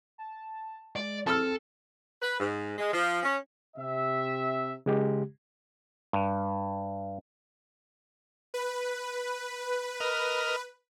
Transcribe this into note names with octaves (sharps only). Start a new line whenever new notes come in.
A5
G#3 D5
C4 A4 A5 E6 F6
B4
G#2
G#3
F3
C#4
C3 E5
C#3 G#3 G4
G2
B4
A#4 D#5 F6